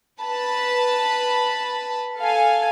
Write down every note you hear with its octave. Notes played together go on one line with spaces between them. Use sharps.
B4 A5 B5
A4 F5 G#5